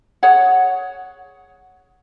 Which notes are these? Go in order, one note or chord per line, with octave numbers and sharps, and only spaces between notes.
G#4 C#5 F#5